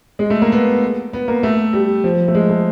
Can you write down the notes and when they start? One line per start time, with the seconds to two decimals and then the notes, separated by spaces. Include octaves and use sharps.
0.19 G#3
0.30 A3
0.42 A#3
0.52 B3
1.13 B3
1.28 A#3
1.43 A3
1.73 G3
2.04 F3
2.28 A3
2.35 G#3
2.50 A3